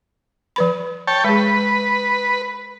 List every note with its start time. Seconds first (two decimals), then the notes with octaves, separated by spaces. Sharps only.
0.56 F3 B4 B5
1.08 C#5 G5 A5
1.24 G#3 G#4 B4